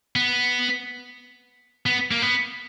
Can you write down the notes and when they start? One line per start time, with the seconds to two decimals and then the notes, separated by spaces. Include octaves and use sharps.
0.16 B3
1.86 B3
2.11 A#3
2.22 B3